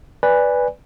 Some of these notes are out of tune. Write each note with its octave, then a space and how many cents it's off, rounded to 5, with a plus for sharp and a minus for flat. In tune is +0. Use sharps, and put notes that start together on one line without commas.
B4 +0 D5 +0 G#5 -15